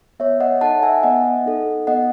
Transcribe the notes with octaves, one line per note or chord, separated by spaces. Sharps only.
B3 C#5 E5
D#5 F#5
D#4 A4 F#5 A5
E5 G#5
B3 D#5 F#5
D#4 A4
B3 D#5 F#5